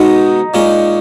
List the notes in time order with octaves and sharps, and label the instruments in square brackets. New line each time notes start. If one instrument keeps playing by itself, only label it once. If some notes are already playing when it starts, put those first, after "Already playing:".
Already playing: [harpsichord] B2 G#3 B3 F#4 B4 [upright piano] D#4
[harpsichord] A#2 G#3 C#4